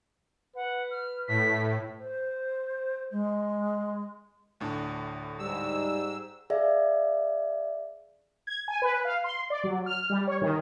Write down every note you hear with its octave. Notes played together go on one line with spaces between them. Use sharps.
B4 F#5
F6
A2 B6
C5
G#3
D2 A2 D4
G#2 G3 E6
G#4 D5 E5 F5
G#6
G#5
B4
F5
C6
D5
F#3
F6
G3
C#5
D#3